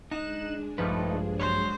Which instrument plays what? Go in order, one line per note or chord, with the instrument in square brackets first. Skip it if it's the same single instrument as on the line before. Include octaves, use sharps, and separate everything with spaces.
[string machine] G#3 D4 G#4 [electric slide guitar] D#4 [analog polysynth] F#6 E7
[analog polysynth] A#1 G2 F3 [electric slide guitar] A3 D#4 B4
[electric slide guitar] F#3 C#5 [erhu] C5